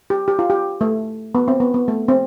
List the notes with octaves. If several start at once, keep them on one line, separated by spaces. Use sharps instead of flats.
G4
G4
F4
G4
A3
B3
C4
B3
B3
A3
C4